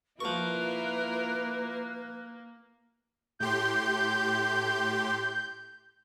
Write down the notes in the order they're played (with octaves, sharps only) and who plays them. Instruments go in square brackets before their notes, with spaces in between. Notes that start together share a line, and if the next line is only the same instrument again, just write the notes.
[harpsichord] F3 C#6 [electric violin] A#3 [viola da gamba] E4 F4 A#4 [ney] B4
[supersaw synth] A2 G4 C6 [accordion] G6